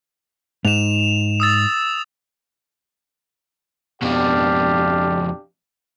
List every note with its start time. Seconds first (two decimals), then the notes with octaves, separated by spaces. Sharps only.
0.65 G#2 E7 F7
1.40 D#6 E6 A6
4.02 F2 B2 D4 G4 F5